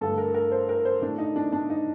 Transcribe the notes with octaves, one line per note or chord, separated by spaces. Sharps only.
G2 D3 A3 A4
A#4
A#4
C5
A#4
C5
A2 A3 D4
D#4
D4
D4
D#4